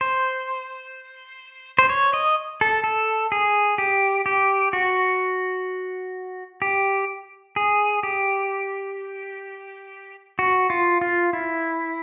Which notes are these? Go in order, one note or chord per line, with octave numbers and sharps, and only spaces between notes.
C5
C5
C#5
D#5
A4
A4
G#4
G4
G4
F#4
G4
G#4
G4
F#4
F4
F4
E4